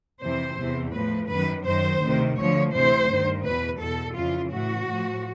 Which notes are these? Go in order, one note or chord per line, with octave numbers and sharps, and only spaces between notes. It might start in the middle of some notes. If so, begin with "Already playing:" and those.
F2 C3 E3 C5
E2 C3 E3
A2 F3 B4
F#2 D#3 B4
F#2 D#3 C5
D2 C3 D#3
D2 D3 F3 C#5
D2 C3 E3 C5
G2 D#3
E2 B2 B4
E2 B2 A4
F2 C#3 E3 F4
A2 E3 F#4
A2 F3